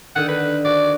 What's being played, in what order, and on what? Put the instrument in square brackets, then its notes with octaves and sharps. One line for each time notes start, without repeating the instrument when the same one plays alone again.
[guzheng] D3 D#3 [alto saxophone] F#5
[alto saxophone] B4
[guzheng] F#4 [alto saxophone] D5